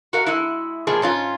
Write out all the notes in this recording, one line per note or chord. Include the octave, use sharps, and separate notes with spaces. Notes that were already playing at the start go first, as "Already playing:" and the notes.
F#4 A#4 F5
G#3 E4
B2 F3 A#3 G#4
G#2 C#4 F4